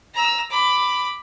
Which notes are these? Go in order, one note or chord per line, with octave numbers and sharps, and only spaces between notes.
A#5 E6
B5 D6